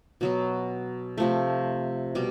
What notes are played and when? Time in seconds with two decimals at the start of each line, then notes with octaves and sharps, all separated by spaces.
0.21 B2 F#3 B3
1.18 C3 F3 A3
2.15 B2 G3